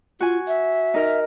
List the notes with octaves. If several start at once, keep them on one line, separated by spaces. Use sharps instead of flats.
F4 F#4 G#5
E5
D#4 A#4 F6